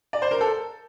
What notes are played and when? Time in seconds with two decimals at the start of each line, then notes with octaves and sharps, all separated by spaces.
0.13 D5
0.22 C5
0.31 A#4
0.41 A4